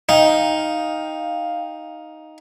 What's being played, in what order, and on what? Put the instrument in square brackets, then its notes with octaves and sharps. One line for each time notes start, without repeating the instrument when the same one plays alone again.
[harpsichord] D#4 [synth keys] F5 G5